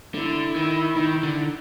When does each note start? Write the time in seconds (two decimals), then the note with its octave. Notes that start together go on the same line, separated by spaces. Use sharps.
0.14 D3 E4
0.56 D#3
0.96 D#3
1.23 D3